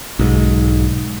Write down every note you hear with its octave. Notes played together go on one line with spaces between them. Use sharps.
B1 G#2